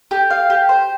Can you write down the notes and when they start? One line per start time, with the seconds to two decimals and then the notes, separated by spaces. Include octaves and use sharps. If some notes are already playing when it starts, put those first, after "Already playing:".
0.11 G4
0.30 F5
0.50 G4
0.69 C5